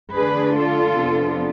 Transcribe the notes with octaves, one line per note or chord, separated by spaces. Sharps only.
D3 A3 D4 G#4 B4
F4 A4
F2 C3 F3 B3 D4